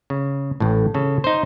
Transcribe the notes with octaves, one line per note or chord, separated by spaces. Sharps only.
C#3
A1 A2
C#3 A4
D#4 C5